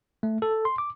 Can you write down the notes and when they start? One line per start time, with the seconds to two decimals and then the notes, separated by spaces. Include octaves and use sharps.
0.23 A3
0.42 A4
0.65 C6
0.78 D6